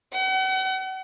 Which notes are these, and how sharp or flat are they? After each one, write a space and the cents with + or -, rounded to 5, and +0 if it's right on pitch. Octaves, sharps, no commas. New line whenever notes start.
F#5 +40